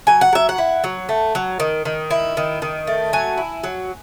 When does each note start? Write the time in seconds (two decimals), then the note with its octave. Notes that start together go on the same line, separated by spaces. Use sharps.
0.07 F#3 G#5
0.21 F#5
0.33 F#3 E5
0.49 F#5
0.58 E4
0.84 F#3
1.09 A3
1.35 F#3
1.60 D#3
1.85 D#3
2.11 E4
2.37 D#3
2.62 D#3
2.87 A3
3.13 F#3 G#5
3.38 E4
3.64 F#3